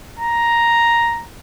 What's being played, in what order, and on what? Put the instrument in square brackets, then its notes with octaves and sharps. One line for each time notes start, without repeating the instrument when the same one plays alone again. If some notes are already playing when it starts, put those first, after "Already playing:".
[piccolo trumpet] A#5